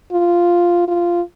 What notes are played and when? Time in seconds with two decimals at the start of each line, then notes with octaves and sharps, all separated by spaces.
0.12 F4
0.88 F4